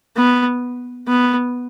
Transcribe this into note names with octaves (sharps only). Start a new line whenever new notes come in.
B3
B3